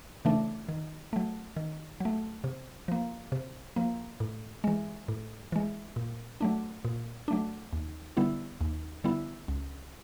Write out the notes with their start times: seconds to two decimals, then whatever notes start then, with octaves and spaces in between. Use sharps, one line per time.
0.25 C#3 E3 A3 D4
0.69 D#3
1.13 F#3 A3
1.56 D#3
2.00 F#3 A3
2.44 C3
2.88 F3 A#3
3.32 C3
3.76 F3 A#3
4.20 A2
4.64 E3 G#3
5.08 A2
5.52 E3 G#3
5.96 A#2
6.41 F#3 A3 D4
6.85 A#2
7.28 F#3 A3 D4
7.73 D#2
8.17 D3 G3 B3 E4
8.61 D#2
9.04 D3 G3 B3 E4
9.48 C#2